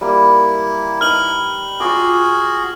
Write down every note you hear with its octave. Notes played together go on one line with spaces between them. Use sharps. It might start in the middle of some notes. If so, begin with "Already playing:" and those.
G3 A#3 E4
D#4 B4 F6 F#7
F4 F#4 G#4 D6